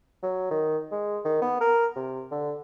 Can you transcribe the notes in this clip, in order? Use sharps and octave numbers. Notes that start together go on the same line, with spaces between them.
F#3
D#3
G#3
D#3
B3
A#4
C3
D3